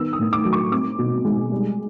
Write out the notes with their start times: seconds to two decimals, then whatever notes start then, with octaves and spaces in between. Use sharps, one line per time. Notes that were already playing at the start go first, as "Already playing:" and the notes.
Already playing: D#3 B3 E6
0.13 D#6
0.19 A2
0.33 D6
0.45 F#3
0.53 C#6
0.72 C4 D6
0.98 B2
1.25 G#3
1.51 G3